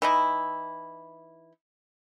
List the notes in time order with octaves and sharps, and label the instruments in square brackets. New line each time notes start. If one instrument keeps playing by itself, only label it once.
[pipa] E3 D#4 E4